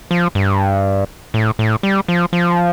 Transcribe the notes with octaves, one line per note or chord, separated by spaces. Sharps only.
F3
G2
A2
A2
G3
F3
F3